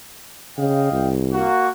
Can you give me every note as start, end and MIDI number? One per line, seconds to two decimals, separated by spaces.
0.58 0.90 49
0.58 1.10 75
0.58 1.10 77
0.58 1.10 79
0.91 1.47 36
1.33 1.69 58
1.33 1.69 66